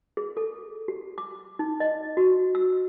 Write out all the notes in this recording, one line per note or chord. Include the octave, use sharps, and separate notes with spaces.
G#4
A4
G4
D6
D#4
D#5
F#4
E6